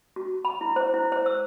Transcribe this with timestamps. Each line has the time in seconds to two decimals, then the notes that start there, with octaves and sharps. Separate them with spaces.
0.16 F#4
0.45 B5
0.61 E4
0.76 C5
0.94 E4
1.12 C5
1.26 E6